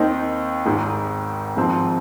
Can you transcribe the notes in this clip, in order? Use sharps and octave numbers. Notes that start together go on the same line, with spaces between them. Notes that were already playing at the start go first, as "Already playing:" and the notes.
Already playing: D#2 D#3 C4 D#4
G#1 G#2 D#3
G#1 G#2 F3 C4